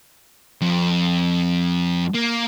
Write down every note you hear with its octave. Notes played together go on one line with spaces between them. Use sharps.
F2
A#3